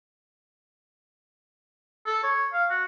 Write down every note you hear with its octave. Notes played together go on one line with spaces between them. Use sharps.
A4
C#5
F5
F#4